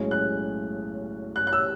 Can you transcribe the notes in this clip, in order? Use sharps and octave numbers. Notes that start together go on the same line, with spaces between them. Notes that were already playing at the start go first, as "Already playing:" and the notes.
Already playing: B1 A2 G#3 C#4
F#6
F#6
F#6
E6